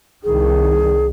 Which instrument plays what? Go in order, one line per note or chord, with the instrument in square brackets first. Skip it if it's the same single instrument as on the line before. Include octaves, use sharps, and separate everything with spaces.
[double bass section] C2 D#3 [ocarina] G#4